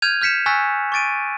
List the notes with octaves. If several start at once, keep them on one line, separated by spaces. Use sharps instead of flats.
F6 G6 G#6 D#7 F7
F6 G6 B6 C#7 E7
G#5 C#6 E6 F#6 A6 B6
C#6 D6 A6 D7 D#7